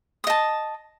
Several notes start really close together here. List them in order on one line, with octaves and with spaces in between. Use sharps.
D#6 D#5 A5